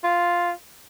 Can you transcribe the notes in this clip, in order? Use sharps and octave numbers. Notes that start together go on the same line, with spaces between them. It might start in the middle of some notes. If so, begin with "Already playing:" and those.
F4